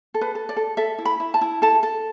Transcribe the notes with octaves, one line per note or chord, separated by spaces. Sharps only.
A4
B4
A4
D5
A4
A4 E5
E4
B5
E4
A5
E4
A4 A5
A4